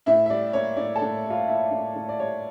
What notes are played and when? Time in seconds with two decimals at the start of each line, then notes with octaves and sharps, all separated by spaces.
0.06 A2 E4 E5
0.26 E5
0.30 G3 D5
0.53 A#3 C#5
0.77 A2 D5
0.96 A4 A5
1.01 A2
1.24 G3
1.30 F4 F5
1.48 A#3 E4 E5
1.71 A2
1.95 A2
2.09 D5
2.20 G3 C#5